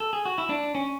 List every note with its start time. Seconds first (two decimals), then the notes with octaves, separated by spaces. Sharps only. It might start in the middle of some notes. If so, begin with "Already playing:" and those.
0.00 A4
0.13 G#4
0.25 F#4
0.38 E4
0.49 D4
0.75 C#4